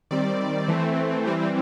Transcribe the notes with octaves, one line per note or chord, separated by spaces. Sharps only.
D#3 G3 C4 D5
E3 A3 C4
E3 G3 C4